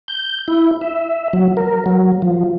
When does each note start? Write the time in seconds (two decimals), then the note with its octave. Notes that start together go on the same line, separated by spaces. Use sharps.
0.08 G6
0.48 E4
0.81 E5
1.33 F#3
1.57 A#4
1.86 F#3
2.22 F3